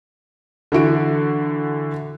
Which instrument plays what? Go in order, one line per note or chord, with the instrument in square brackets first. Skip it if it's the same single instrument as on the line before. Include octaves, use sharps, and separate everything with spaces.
[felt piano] D3 E3 F#4 D7